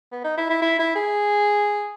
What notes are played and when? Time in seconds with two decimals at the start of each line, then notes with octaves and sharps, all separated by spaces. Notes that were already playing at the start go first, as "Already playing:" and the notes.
0.12 B3
0.24 D#4
0.38 E4
0.50 E4
0.62 E4
0.79 E4
0.96 G#4